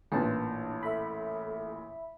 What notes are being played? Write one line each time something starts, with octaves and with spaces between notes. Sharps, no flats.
A1 A#2 D4 B4 A5
A4 E5 B5